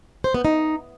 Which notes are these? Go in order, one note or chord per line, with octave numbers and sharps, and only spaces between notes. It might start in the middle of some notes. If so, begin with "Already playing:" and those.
C5
B3
D#4